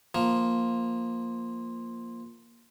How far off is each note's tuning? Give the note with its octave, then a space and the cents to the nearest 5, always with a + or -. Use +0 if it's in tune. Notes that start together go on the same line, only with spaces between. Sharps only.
F3 +0 A#3 +0